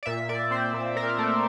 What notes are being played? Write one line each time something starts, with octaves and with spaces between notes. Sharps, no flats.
D5
A#2 E5
A#2 D5
C4 C5
A#2
A#2 A#4
A3